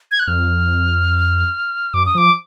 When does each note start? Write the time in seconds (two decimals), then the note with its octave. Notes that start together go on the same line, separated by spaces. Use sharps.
0.11 G#6
0.20 F#6
0.27 F2 F6
1.94 F#2 D6
2.06 D#6
2.15 F3 D6